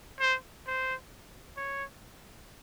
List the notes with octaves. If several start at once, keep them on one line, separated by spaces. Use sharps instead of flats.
C5
C5
C#5